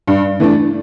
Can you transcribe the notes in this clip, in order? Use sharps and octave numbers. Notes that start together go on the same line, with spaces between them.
G2
E3 A3 D4